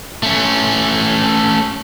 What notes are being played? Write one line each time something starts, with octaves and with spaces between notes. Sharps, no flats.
A3 C#4